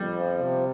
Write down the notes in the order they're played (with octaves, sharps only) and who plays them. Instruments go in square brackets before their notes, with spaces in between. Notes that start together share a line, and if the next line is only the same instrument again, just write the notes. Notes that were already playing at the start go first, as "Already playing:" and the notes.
Already playing: [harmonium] F2 [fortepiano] G3
[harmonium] F3
C3